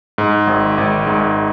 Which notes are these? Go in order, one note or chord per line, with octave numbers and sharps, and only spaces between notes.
G#2
G#1
G#1
G#2